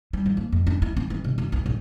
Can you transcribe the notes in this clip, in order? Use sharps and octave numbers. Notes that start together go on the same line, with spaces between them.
G3
F3
A#3
F2
D4
E4
C4
E3
C3
F#2
B1
A#1